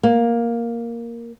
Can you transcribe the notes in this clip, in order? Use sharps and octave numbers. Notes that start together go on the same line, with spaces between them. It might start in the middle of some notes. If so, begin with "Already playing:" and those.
A#3